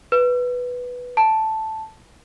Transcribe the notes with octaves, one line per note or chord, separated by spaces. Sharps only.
B4
A5